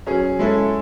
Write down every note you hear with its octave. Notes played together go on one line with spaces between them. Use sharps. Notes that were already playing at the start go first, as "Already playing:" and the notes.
F#3 C#4 G#4
G#3 C#4 E4 A4